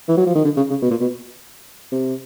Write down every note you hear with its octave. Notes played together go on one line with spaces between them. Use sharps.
E3
F#3
F3
D#3
D3
C#3
C#3
B2
A#2
B2
C3